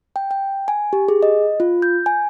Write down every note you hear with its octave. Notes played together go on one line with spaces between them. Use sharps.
G5
G5
G#5
G4
G#4
D#5
F4
G6
G#5